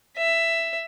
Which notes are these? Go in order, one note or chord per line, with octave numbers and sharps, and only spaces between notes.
E5